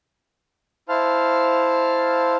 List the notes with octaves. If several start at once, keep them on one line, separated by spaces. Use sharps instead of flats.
E4 C5 F5 A5 F6